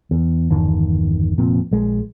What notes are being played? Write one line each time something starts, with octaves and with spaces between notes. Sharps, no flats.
E2
G1 E2 D#3
F1 A#2 F3 C4
A#1 G#3